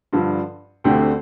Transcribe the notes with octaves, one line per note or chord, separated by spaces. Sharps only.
G2 D3 F3
D2 D3 A3 C4 G4